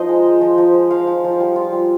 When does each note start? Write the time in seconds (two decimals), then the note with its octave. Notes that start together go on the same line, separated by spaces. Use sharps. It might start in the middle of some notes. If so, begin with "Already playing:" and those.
Already playing: F3 D#4 C5 D#5
0.09 G#3
0.26 G#3
0.41 F3
0.58 F3
0.74 G#3
0.91 F3 F5
1.07 F3
1.24 F3
1.40 G3
1.56 F4
1.73 G3